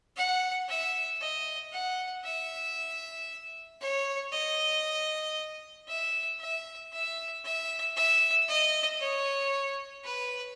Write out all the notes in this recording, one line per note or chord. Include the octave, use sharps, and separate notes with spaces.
F#5
E5
D#5
F#5
E5
C#5
D#5
E5
E5
E5
E5
E5
D#5
C#5
B4